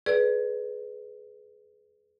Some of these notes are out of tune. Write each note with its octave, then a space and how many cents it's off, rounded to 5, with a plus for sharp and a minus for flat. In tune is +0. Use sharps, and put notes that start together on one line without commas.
G#4 +25 B4 +0 D5 +0